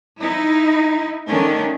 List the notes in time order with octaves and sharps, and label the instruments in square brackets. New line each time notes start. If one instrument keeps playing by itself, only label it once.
[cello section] D#4 E4
D#3 A3 C#4 D4